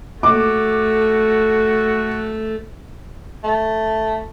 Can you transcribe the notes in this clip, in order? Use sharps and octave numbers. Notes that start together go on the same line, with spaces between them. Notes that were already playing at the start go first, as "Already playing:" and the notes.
A3 F#4 A4 D6
A3